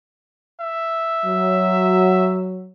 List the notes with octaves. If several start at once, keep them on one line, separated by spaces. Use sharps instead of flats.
E5
F#3